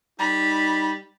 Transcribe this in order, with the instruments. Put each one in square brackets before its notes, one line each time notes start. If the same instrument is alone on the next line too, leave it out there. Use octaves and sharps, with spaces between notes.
[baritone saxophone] G3 [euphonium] D#4 [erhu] B5